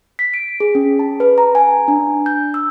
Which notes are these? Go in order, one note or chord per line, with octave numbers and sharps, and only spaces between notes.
B6
D7
G#4
C#4
A5
B4
A#5
G#5
D4
G6
E6